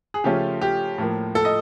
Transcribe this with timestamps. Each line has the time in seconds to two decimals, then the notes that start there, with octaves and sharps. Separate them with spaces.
0.14 G#4
0.24 C#3 F3 A3 C#4 F4 G4
0.61 G4
0.98 A2 F3 A#3
1.35 A4
1.45 D#5